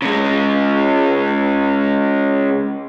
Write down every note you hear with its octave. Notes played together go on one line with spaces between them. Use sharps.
C#3 G#3